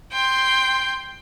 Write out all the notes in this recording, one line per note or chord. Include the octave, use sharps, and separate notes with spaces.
G5 C6